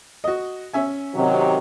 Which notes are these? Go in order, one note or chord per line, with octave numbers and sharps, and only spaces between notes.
F#4 D#5
C#4 E5 G#5
C3 D#3 F#3